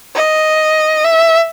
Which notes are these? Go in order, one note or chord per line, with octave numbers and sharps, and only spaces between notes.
D#5
E5